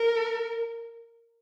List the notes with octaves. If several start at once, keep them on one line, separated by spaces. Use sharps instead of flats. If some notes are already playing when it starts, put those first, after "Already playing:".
Already playing: A#4